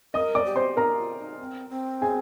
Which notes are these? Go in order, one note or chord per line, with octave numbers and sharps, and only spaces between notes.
A#4 D#5 D#6
D5 D6
G4
C5 C6
D#4 A#4 A#5
F4
D#4
C4
C4
G#4 G#5